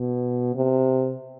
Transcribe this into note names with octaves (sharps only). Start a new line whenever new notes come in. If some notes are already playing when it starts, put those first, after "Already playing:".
Already playing: B2
C3